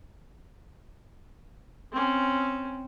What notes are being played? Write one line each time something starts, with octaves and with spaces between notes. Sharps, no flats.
C4 C#4